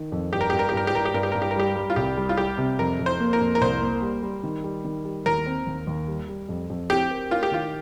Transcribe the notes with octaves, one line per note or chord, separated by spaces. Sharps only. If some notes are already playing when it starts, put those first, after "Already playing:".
Already playing: D#3
F2
G2 G4
A#4
G2 G4
A#4
G4
G2 A#4
G4
G2 A#4
G4
G2 A#4
G4
G2 A#4
G4
A#4
G3 G4
G3
F4
C2 G4
G3
F4
G3 G4
C3
F2 A#4
F2
C5
A#3
A#4
F2
A#4
C2 C5
A#3
G3
G3
D#3
G3
D#3
G3
D#2 A#4
C4
D#2
D#2
G3
G3
F2
F2
C4 G4
A#4
F4 A#4
G4
D#3 F4